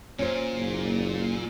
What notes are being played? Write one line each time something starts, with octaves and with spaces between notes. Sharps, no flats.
A#2 C#4 C5
F#1